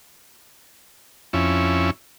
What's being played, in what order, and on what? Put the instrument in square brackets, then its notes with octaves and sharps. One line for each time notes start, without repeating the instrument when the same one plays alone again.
[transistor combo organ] F2 C#4 E4